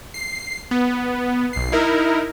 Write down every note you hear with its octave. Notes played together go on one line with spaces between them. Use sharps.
C7
B3
B1 C7
D#4 E4 A#4